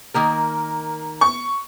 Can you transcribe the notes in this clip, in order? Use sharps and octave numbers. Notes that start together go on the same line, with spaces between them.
D#3 A#3 A#4
C#6